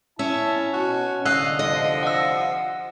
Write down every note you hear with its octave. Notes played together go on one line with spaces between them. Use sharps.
C#4 E4 E5 A5
B2 F#4
C2 D3 D#5 F5 E6 F#6
F3 D#5
F#5 E6